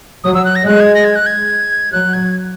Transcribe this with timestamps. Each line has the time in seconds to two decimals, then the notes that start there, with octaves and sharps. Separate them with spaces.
0.24 F#3 D#6
0.34 E6
0.45 F#6
0.56 A#6
0.66 G#3 F#6
0.80 G#6
0.95 A#6
1.04 G#6
1.16 F#6
1.26 G#6
1.92 F#3 F#6
2.13 G#6